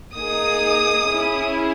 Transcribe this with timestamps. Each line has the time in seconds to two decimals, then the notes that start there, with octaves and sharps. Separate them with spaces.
0.16 A#3 D#4 G#4 D#6
1.09 C#4 E4 G#4